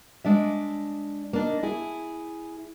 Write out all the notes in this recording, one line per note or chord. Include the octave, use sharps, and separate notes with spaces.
G#3 D4 D5 E5
A#3 D4 D#4
E4 G#4